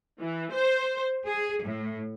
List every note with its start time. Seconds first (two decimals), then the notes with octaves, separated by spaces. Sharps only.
0.18 E3
0.52 C5
1.26 G#4
1.63 A2